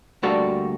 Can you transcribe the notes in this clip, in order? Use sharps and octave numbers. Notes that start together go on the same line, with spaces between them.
D2 D3 G3 A#3 F#4 A4